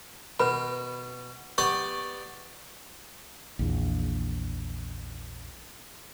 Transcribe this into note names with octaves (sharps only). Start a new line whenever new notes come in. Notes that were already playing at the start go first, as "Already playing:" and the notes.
B2 B4 B5
B3 G4 D5 C#6
A#1 E2